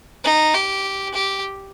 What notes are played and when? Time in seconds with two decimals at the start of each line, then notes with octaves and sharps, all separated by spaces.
0.24 D#4
0.54 G4
1.14 G4